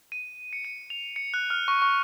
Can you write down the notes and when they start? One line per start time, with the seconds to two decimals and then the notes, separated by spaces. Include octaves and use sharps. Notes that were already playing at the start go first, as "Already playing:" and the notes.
0.12 D#7
0.53 C#7
0.65 D#7
0.90 F7
1.16 C#7
1.34 F#6
1.50 F6
1.68 C#6
1.82 C#6